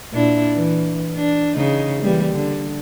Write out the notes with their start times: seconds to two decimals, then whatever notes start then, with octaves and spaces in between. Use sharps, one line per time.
0.12 A#2 D4 E4
0.54 E3
1.16 D4
1.56 C#3 D#4
2.02 E3 G3 A#3
2.33 D3